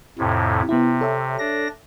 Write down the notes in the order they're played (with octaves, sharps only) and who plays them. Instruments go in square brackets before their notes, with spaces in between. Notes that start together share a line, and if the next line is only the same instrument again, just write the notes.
[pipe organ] F2 A2 C3
[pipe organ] C3 [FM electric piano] B3 E4
[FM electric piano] A4 C#5 E5
[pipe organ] D4 A#6